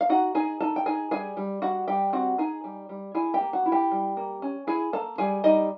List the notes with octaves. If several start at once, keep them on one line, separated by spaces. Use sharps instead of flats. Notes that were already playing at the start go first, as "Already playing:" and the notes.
F5
D#4 F#4 F#5
D#4 G#4 G#5
D#4 A4 A5
G5
D#4 G#4 G#5
G3 G#4 G#5
G3
G3 F#4 F#5
G3 G4 G5
C4 F#4 F#5
D#4 G#4 G#5
G3
G3
E4 G#4 G#5
G4 G5
A#3
F#4 F#5
E4
G4 G5
G3
A#3
C#4
E4 G#4 G#5
A#3 A4 A5
G3 G#4 G#5
G3 D#4 D#5